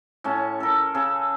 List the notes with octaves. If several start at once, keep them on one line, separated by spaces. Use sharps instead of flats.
A2 C#4 A5
A4 A#4
C#3 G#4 A4